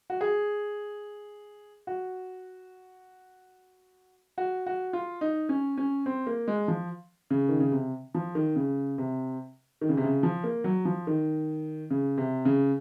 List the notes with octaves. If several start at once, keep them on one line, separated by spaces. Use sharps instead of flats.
F#4
G#4
F#4
F#4
F#4
F4
D#4
C#4
C#4
C4
A#3
G#3
F3
C#3
D#3
C#3
C3
F3
D#3
C#3
C3
D#3
C#3
C3
C#3
F3
A#3
F#3
F3
D#3
C#3
C3
C#3